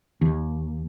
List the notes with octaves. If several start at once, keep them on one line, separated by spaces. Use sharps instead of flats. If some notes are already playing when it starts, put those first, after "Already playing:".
D#2